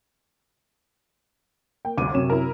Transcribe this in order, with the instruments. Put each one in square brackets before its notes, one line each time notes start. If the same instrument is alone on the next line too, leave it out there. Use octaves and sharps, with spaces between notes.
[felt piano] A#3 [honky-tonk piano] G5
[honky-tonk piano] G1 D2 [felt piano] D6 D#7
[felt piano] F#2 C3 [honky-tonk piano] C#5 E7
[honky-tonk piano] E4 A#4